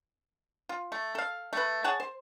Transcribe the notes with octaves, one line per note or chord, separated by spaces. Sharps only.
F4
A3
A4 F5
A3 B4
G#4 C#5 F#5 A5
C5